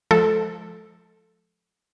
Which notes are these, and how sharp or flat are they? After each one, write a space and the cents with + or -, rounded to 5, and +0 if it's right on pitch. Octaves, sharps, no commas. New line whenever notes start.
F3 +0 G#3 +30 A4 +0